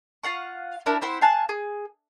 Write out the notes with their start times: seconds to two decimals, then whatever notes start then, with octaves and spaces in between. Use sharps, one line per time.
0.23 F4 F5 F#5 C#6
0.86 D4 E4 A#4
1.02 C4 E4 C5 F#5
1.21 F5 G#5 A5 F#6
1.49 G#4